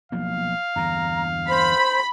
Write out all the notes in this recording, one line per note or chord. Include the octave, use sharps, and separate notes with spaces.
B1 F3 A#3 F5
E2 G2 D3 A#5
C5 B5